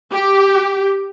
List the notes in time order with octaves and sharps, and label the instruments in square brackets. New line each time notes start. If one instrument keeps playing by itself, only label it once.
[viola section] G4